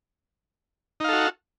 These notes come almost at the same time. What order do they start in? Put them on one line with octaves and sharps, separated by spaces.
D#4 F5 A4 F#4